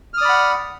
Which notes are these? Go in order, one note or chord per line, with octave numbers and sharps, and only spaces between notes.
D5 F#5 B5 D#6 F6